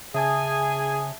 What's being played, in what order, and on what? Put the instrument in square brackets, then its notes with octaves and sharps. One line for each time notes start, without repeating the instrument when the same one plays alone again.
[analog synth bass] C#3 [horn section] G#4 G#5 [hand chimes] E5 A5 D#6